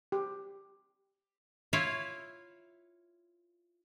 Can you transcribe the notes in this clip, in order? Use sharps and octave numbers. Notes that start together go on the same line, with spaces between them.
G4
E4 F4 C#5 E5 F5